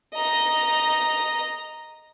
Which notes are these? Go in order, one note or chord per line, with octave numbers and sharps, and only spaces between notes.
D#5 A#5